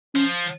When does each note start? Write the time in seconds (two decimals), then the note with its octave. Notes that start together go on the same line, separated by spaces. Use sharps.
0.15 F3 C#4